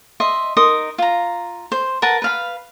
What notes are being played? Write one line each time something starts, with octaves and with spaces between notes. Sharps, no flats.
D#5 E5 C6
D#4 A#4 C6 D#6
F4 A#5
C5
A#4 B4 F#5 A5
B4 F5 B5